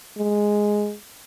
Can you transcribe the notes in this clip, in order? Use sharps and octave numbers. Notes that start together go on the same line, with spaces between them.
G#3